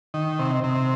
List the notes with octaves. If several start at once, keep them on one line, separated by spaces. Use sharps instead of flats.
D#3
C3
C3